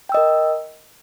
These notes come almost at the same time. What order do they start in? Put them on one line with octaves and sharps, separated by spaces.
G5 E6 D#5 A#4